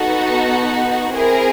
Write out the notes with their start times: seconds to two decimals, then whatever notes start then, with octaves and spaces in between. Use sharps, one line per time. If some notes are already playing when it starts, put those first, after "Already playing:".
Already playing: B3 D#4 F#4 A4
1.14 C4 E4 G#4 A#4